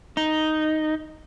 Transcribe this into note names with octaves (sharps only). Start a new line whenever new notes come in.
D#4